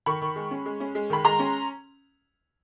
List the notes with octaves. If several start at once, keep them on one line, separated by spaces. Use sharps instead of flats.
D#3 B5 C#6
D#3
G#3
C#4
G#3
C#4
G#3
D#3 B5
G#3 A#5 C6
C#4